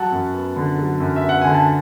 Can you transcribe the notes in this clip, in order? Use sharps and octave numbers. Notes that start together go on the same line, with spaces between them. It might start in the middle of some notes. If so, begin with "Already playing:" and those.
Already playing: F#3 F#5 A5
F#2
B3
D3
F#3
F#2
E5
B3
F#5
D3 G#5
A5